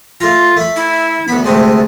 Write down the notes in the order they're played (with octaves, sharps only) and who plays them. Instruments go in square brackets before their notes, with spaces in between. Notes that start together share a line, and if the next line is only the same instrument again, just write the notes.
[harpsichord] A3 A#5 [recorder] F4
[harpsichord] A3 B5
[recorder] E4
[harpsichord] D2 B5 [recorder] B3
[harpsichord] D2 C3 G#3 [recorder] A3